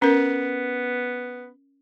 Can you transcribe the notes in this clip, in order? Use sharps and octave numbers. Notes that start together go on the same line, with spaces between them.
B3 C#4 A#4